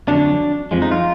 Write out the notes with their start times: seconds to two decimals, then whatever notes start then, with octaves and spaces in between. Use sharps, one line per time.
0.08 F2 D3 F#3 D4
0.71 F2 F3 G#3
0.82 D#4
0.91 F4